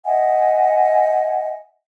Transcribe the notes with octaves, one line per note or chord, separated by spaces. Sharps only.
D#5 E5 F#5 G#5